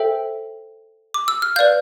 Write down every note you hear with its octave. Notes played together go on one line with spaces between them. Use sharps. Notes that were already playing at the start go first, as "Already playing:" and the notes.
Already playing: A4 C5 E5 G5
D6
E6
F6
B4 D5 F5 G6